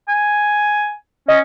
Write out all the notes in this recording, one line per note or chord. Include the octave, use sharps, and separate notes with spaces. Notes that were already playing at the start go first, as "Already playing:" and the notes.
G#5
C#4 D#5